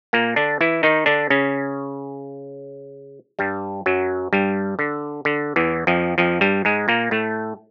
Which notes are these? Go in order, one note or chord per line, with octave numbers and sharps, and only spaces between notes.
A#2 A#3
D3 D4
E3 E4
D#3 D#4
D3 D4
C#3 C#4
G2 G3
F#2 F#3
G2 G3
D3
D3
E2 E3
F2 F3
F2 F3
G2 G3
G#2 G#3
A#2 A#3
A2 A3